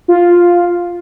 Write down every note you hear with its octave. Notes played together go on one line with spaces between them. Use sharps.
F4